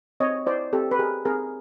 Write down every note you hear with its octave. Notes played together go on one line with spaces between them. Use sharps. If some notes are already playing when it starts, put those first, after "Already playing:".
C4 C#5 D#5
E4 C5 D5
C4 G4 A4
B4
G4 G#4 A#4
C4 G#4 A#4